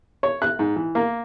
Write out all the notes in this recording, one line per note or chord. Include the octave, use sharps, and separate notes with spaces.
C#5
F#6
G#2
E3
A#3